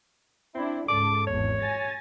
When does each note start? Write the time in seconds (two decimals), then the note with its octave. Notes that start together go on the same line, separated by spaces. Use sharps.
0.55 C4 D4 E4
0.89 C#2 G#2 A4 D6
1.27 G#1 E2 C#5
1.63 G#5 A6 A#6